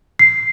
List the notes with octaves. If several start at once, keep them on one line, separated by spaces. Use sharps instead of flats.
C7